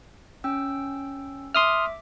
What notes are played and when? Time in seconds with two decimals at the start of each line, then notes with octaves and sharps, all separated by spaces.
0.44 C#4 G5 E6
1.55 E5 C6 D6 D#6 F6